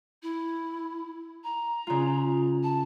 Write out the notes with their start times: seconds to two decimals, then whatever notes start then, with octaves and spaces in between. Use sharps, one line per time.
0.22 E4
1.43 A#5
1.87 C#3 F4
2.63 A5